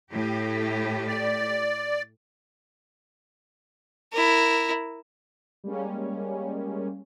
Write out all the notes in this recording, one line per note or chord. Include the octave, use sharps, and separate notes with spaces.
A2 G4
D5
E4 A#4
G3 G#3 A#3 C#4